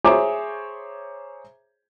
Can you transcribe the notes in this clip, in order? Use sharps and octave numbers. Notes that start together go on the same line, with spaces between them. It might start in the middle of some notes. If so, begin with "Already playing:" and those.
G#4 C5 C#5 E5 A#5 D6